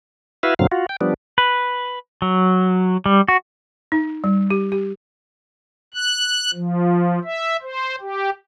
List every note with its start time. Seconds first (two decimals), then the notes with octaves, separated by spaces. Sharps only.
0.43 E4 F#4 B4 E5 F5
0.59 F#2 A#2 D3 F#3 C4 F5
0.72 F4 F#4
0.89 G5
1.01 F3 G3 B3 D4
1.38 B4
2.22 F#3
3.06 G3
3.28 F#4
3.92 D#4
4.24 G3
4.50 G4
4.72 G4
5.94 F#6
6.54 F3
7.24 E5
7.62 C5
8.01 G4